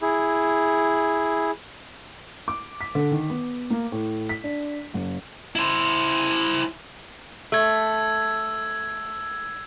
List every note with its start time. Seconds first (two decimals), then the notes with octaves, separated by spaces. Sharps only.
0.02 E4 G#4
2.48 D6
2.81 B6
2.95 D3
3.12 D#3
3.30 B3
3.70 A#3
3.92 A2
4.29 B6
4.44 D4
4.94 F#1
5.56 E4 C5
7.52 A3 E6 G#6